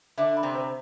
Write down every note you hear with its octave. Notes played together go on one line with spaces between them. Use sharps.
D3 D4 E5
B5
C3 C4
C5